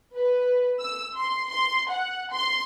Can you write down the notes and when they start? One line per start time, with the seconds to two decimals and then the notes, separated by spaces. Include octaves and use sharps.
0.15 B4
0.80 E6
1.17 C6
1.50 C6
1.90 F#5
2.33 C6